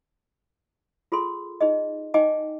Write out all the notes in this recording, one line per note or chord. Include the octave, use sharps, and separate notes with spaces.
F4 G#4 A4 C6
D#4 G#4 D#5
D#4 D#5 G5 G#5 D6